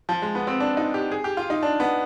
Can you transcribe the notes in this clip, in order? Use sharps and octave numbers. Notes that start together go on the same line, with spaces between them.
F3
G#3
B3
C4
D4
D#4
G4
G#4
G4
F4
D#4
D4
B3